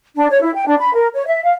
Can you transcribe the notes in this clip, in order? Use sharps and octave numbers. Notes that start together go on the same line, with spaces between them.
D4
C#5
E4
G5
D4
B5
A#4
C#5
E5
F5